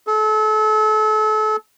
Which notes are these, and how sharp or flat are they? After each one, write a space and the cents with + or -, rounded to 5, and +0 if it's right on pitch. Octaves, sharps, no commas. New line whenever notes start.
A4 -35